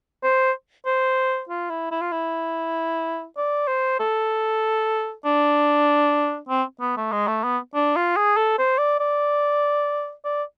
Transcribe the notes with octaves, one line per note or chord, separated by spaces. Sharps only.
C5
C5
F4
E4
E4
F4
E4
D5
C5
A4
D4
C4
B3
A3
G#3
A3
B3
D4
F4
G#4
A4
C5
D5
D5
D5